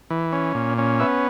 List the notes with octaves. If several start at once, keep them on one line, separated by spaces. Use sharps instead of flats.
E3
C#4
A#2
C#4
B3 E5